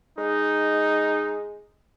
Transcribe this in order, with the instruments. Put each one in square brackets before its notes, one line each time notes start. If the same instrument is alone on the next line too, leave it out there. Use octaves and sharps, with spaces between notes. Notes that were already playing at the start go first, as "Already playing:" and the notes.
[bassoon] G#3 [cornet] D#4